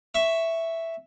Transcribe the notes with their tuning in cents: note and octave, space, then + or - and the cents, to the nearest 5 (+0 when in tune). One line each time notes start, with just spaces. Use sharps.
E5 +0 C#6 +0